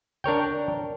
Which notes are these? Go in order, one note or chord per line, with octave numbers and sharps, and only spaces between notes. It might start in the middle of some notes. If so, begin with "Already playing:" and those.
D4 A#4 C#5 G5